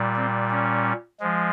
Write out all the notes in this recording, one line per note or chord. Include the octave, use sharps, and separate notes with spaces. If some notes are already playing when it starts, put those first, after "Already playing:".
Already playing: A#2 G3
C4
C#4
F3 G#3